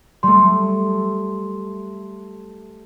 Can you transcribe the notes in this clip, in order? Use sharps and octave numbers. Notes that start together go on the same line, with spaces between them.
G3 A3 C6